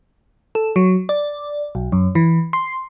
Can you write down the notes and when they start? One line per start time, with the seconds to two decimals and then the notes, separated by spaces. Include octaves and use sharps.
0.55 A4
0.76 F#3
1.09 D5
1.75 B1
1.92 F#2
2.15 E3
2.53 C6